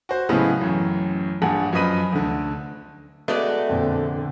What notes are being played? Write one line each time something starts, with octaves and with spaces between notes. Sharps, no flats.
F#4 C5
A2 C#3 F#3 G#3 B3 E4
A1 F#2
A#1 G2 F#5 G#5
F#2 F3 B4 D#5 B5 D#7
D2 D3
G#3 A3 B3 F#4 D5 D#5
F2 A#2 D3